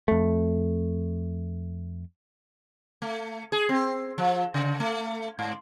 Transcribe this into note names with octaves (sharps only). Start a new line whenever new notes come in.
F2 A3
A3
G#4
C4
F3
C#3
A3
G#2